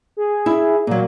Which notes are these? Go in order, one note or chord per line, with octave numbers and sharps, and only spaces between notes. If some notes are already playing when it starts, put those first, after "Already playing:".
G#4
E4 E5
A#2 F#3 A#3